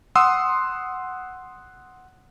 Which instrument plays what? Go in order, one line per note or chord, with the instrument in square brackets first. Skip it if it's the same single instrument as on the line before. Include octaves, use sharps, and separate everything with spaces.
[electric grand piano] F#5 C6 D#6 E6